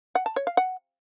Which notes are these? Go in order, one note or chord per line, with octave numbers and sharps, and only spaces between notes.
F#5
A5
C#5
F5
F#5